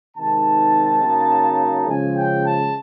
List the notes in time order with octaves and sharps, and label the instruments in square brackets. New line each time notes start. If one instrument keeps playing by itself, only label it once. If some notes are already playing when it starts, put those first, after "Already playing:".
[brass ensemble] C3 D#3 G#3 C4 D#4 A5
C#3 F#3 A#3 D#4
C#3 F3 G#3 C#4 G#5
G5
A5